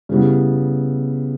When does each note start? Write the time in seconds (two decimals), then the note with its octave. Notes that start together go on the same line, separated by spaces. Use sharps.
0.09 C#3 G3 B3 E4 G4